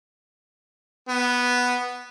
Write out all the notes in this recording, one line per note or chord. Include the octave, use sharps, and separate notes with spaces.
B3